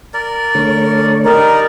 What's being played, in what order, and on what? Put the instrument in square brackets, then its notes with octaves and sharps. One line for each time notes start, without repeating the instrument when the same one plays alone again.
[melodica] A#4 D5
[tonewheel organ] D3 A3 C#5
[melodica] G3 D#4 D5 [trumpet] A#4